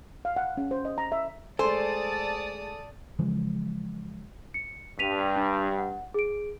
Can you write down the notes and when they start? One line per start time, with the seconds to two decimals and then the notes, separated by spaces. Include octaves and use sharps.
0.25 F5
0.36 F#5
0.57 C#4
0.71 C5
0.85 D#5
0.98 A#5
1.12 E5
1.59 G#3 A3 A4 C5 D5 G#5 A5 D#6
3.19 C#3 E3 F3 G#3
4.54 C#7
4.99 G2 B6 D#7 F7
5.36 D4
5.79 F#5
6.14 G#4 D7